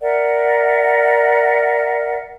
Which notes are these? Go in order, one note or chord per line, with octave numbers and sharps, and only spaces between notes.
A#4 D5 E5 F#5